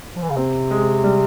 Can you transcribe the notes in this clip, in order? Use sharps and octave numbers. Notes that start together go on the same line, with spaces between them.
F3
E3
C#3
C3 C4
G#3
G3